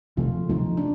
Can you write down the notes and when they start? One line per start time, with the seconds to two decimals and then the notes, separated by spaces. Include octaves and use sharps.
0.17 C3 F3 A3 F4
0.49 C3 F3 A3 D#4
0.77 D4